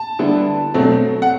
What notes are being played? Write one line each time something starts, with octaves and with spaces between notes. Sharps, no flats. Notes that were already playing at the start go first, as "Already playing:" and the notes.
Already playing: A5
D3 G3 B3 E4
B2 F#3 A3 C4
F#5